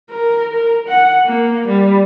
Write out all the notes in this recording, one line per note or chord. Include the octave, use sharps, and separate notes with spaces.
A#4
A#4
F#5
A#3
G3